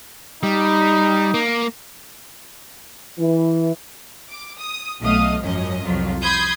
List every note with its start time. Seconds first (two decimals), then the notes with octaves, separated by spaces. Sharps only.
0.43 G3 D#4
1.34 A#3
3.19 E3
4.30 D6
4.59 D#6
5.01 B1 A3 D#5 F5 D#6
5.43 G#1 F#2 F3 C#4 D#5
5.83 C2 F2 F#3 F4
6.22 B5 C6 D#6 G6 G#6 C7